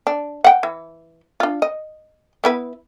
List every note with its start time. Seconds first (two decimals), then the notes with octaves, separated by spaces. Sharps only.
0.07 D4
0.44 F#5 G5
0.63 E3
1.40 D4 F4
1.62 D#5
2.44 B3 E4 B4